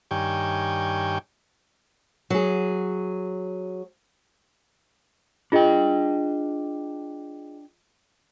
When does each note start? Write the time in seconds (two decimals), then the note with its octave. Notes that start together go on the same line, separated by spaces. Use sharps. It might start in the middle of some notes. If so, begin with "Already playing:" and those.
0.11 G2 D#3 G4 C#5 G5 G#5
2.30 F#3 G#4
5.52 D4 F4 G#4 D#5 G5